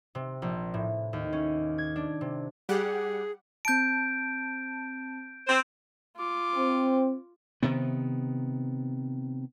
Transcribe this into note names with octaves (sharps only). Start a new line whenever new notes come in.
C3
A#1
A2
D#2
C#4
G#6
D4
C3
G3 G4 G#4 F#5
C4 A5 G6 D7
C4 C5
F4 D6
C4
C3 D#3 B3